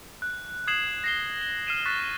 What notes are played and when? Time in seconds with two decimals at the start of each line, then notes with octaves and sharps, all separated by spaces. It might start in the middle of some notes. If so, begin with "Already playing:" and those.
0.22 F#6
0.67 D#6 G#6 C7 E7 F#7
1.04 A#6 C7 G7
1.42 G7
1.67 F6 C7 D#7 E7
1.86 C#6 F#6 A6 B6